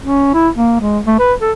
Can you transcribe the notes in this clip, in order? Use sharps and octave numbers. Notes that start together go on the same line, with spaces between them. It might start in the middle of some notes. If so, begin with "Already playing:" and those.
C#4
E4
A#3
G#3
A3
B4
A4